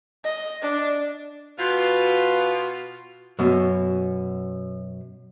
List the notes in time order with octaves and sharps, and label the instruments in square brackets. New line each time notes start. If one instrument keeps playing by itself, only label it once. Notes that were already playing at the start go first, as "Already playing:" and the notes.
[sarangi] D#5
D4
[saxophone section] B2 F4
[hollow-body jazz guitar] F#2 B2